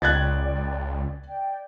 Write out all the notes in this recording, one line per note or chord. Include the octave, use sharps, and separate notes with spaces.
C#2 D5 G5 F#6 G#6 A6
D5 G5